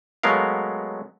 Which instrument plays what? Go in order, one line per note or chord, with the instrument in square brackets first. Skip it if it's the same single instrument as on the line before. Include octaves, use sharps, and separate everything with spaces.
[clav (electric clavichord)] F#3 G#3 A3 B3 A#4 F5